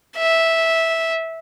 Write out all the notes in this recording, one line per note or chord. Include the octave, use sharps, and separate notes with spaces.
E5